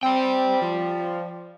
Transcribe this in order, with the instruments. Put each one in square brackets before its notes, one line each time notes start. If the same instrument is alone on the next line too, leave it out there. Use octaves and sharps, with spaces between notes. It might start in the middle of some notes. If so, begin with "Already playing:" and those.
[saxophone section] C4 [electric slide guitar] D5 G5
[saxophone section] F3